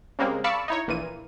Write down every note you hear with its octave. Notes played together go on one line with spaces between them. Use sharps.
C#3 G3 G#3 A#3 C4
D5 F5 A5 B5 C#6 E6
D#4 E4 C#5
A#1 A#2 E3 D#7